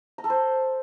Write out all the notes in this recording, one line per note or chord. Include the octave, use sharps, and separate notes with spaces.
A#5
A4
C5